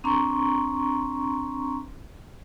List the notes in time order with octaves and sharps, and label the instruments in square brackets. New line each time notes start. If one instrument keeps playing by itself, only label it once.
[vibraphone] C4 D4 A#5 C6 C#6